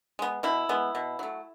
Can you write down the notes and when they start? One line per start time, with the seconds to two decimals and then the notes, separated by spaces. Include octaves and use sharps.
0.19 G#3 B3
0.43 B2 E4
0.69 G#3 B3
0.95 B2
1.19 F#3 A3